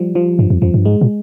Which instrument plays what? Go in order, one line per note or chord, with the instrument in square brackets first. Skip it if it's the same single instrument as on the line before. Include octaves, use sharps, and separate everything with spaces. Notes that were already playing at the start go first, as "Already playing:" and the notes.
Already playing: [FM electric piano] F3 G3
F3
[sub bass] G2 [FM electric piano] F3
[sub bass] F2
[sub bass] F2 [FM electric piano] F3
[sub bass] G2
[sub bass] G#2 [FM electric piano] G#3
[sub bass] A#2